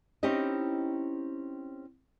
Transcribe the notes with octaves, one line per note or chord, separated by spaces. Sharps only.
C4 C#4 D#4 E4 G4 D#5